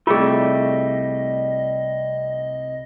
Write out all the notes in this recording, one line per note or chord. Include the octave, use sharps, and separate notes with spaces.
C2 G3 A3 F4 G#4 D#5